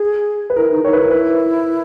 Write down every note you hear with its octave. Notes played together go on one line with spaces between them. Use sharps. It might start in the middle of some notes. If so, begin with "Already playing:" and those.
Already playing: G#4
B4
E4 A#4
D#4
D#4 C#5
B4
E4 A#4
B4